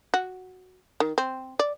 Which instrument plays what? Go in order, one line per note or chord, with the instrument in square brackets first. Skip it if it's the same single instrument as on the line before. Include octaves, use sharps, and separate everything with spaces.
[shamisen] F#4
D#3
C4
D5